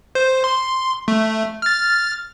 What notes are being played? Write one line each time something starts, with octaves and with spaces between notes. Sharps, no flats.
C5
C6
A3
F6 A6